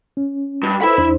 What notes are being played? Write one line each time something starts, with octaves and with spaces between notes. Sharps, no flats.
C#4
G2
E4 A4 B4 C5 B5
E2 D4 C5